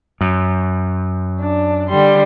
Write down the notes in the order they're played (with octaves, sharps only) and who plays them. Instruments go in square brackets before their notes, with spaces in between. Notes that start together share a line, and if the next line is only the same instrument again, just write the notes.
[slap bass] F#2
[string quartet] D4
D3 G3 C6